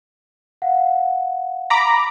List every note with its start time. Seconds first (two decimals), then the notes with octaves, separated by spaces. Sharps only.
0.62 F5 F#5
1.70 A#5 B5 D6